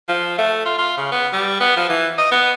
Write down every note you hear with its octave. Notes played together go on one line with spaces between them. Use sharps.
F3
A3
F4
F4
C#3
B3
G3
B3
F3
E3
D#5
B3